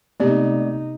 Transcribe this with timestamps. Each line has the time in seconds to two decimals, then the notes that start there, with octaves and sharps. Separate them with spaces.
0.20 C3 G#3 A3 B3 C4 D#4 G4 D5